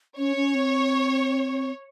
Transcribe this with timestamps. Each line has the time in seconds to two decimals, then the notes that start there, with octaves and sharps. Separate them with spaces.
0.17 C#4 C#5
0.36 C#4
0.55 C4